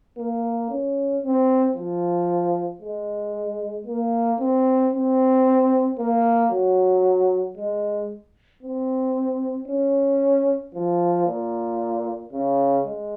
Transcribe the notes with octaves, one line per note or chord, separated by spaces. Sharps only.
A#3
C#4
C4
F3
G#3
A#3
C4
C4
A#3
F#3
G#3
C4
C#4
F3
A#2
C#3
G#3